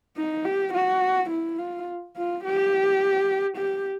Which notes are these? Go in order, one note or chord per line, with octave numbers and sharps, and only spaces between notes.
D#4
G4
F#4
E4
F4
F4
G4
G4